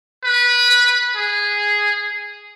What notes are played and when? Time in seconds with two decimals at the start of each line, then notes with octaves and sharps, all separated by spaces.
0.24 B4
1.16 G#4